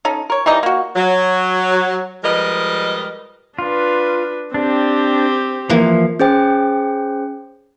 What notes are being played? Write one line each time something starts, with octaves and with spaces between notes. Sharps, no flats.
C#4 D#4 A4
A#4 C#5
E3 G3 D#4 D#5
A#3 F#4
F#3
F3 G3 G#3 A#4 B4 D#5
D4 F4 B4
C4 D4 G4
E3 F3 A#3
C#4 G#4 C5 G5